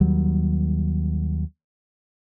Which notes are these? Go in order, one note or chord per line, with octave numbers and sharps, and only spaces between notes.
D#2 F#3 G3